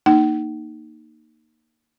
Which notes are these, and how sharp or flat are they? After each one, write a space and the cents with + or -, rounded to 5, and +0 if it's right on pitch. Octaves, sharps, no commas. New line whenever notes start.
A#3 +0 D#4 -10 F#5 +45